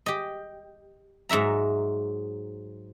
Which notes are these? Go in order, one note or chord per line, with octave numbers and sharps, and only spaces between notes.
G4 D#5
G#2 F#3 E5 A#5